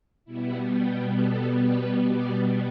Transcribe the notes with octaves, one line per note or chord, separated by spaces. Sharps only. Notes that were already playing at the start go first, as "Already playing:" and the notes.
B2 G3 B3 E4
G4
A4
B4
D5